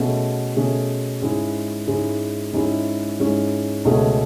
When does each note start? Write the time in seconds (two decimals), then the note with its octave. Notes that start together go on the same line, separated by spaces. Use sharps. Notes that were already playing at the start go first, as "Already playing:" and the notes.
Already playing: B2 A3 C#4 G#4
0.56 B2 A3 C#4 G#4
1.22 G#2 G#3 C#4 E4 G#4
1.88 G#2 G#3 C#4 E4 G#4
2.53 G#2 G#3 C#4 E4 G#4
3.19 G#2 G#3 C#4 E4 G#4
3.85 C#2 B2 A3 C#4 G#4